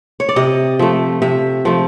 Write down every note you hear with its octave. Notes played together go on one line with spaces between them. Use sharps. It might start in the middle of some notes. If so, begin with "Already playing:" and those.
C#5
D5
C3 D#5
F3 A3 E5
C3 E5
F3 A3